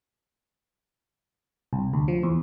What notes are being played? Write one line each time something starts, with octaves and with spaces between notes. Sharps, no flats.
C2
D2
F3
E2